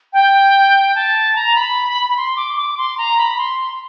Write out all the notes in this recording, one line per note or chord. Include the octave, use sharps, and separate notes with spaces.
G5
A5
A#5
B5
B5
C6
D6
C#6
D6
C6
A#5
B5
C6